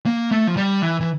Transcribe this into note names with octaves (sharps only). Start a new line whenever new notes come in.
A#3
A3
F3
G3
E3
E3